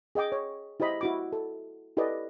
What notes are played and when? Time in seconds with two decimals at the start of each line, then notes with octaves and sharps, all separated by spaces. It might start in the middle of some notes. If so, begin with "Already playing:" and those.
0.15 G#4 D#5 G5 D6
0.32 C#5
0.80 E4 G4 C5 D#5 B5
1.01 E4 F#4 D6
1.32 A4
1.97 E4 G4 A4 B4 D5 D#5